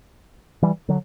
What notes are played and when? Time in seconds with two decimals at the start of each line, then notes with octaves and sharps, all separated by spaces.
0.62 E3 G3
0.89 D3 F#3